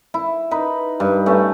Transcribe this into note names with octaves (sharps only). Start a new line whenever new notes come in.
E4
D#4 B4
G2
A3 C#4